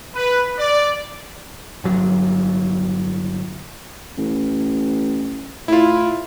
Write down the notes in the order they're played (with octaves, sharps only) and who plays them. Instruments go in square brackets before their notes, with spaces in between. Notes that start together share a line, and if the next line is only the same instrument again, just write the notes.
[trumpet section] B4
D5
[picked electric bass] G1 F#3
[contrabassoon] A1
[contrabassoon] A2 [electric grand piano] E4 F4